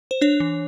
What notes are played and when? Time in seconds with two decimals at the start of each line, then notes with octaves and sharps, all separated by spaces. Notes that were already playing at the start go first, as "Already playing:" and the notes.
0.11 C5
0.21 D4 C#5
0.40 E3